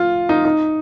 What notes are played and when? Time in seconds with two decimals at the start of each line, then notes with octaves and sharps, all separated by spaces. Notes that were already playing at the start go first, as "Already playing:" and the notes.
Already playing: F4
0.29 D#4
0.45 D#4